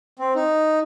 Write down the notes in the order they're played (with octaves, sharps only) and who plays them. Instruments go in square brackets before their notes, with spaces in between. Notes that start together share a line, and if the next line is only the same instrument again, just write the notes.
[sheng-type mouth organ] C4
D#4